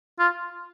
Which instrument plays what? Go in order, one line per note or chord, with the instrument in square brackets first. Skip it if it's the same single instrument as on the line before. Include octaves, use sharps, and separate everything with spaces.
[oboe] F4